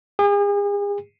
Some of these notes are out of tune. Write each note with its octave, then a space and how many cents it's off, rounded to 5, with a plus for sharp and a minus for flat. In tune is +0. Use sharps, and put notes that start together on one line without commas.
G#4 -40